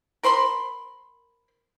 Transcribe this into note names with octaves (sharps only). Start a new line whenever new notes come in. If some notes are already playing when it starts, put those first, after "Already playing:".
A#4 C5 B5 C6